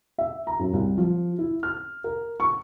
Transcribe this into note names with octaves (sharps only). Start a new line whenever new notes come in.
E5
A#5
F#2
C2
F3
E4
F6
A#4
C#6